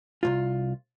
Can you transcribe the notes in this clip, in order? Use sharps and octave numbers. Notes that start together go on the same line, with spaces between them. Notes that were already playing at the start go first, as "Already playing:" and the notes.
C2 F#2 F4